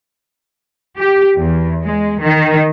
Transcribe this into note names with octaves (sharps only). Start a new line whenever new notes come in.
G4
E2
G#3
D#3